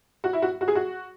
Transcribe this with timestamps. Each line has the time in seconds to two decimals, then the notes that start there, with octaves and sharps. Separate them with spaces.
0.24 F#4
0.33 E4
0.42 F#4
0.61 F#4
0.68 G#4
0.75 F#4